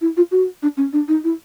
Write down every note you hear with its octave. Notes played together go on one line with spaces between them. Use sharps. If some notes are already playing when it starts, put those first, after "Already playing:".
E4
F4
F#4
D4
C#4
D4
D#4
E4